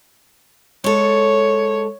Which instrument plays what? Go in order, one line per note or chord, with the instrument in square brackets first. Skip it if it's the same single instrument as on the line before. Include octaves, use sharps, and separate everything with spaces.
[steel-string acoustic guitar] G#3 A4 [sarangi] C#5